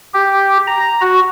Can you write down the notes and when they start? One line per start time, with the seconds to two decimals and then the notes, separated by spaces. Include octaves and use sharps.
0.14 G4
0.67 A#5
1.01 F#4